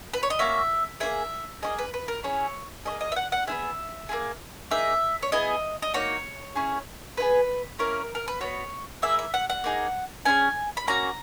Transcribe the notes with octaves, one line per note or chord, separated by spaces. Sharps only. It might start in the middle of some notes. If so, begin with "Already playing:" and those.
B4
C#5
D#5
A#3 C#4 F#4 E5
A#3 C#4 G#4 E5
A#3 C#4 G#4 D#5
B4
B4
A#4
C#4 E4 G#4 C#5
C#4 G#4 D#5
A#3
D#5
E5
F#5
F#5
B3 E4 G#4 E5
A#3 E4 G#4
A#3 D#4 G#4 E5
C#5
B3 E4 G#4 D#5
D#5
A#3 D#4 F#4 C#5
C#4 E4 G#4
B3 E4 G#4 B4
A#3 C#4 E4 A#4
A#4
B4
B3 F#4 C#5
A#3 E4 G#4 E5
E5
F#5
F#5
A#3 D#4 G#4
C#4 E4 G#4 G#5
B5
A#3 C#4 F#4 A#5